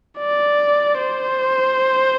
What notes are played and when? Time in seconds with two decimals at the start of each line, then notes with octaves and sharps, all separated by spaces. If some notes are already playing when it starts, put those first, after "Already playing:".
0.19 D5
0.99 C5